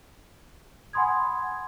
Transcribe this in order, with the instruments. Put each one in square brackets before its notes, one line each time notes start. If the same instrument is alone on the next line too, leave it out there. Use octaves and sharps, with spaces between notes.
[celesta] F#5 G#5 B5 C6 D#6 G#6